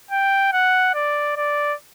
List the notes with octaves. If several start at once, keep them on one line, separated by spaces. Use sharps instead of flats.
G5
F#5
D5
D5